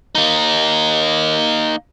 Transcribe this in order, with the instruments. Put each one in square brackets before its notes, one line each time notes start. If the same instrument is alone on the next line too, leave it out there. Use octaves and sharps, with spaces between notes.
[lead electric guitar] A#3 D#4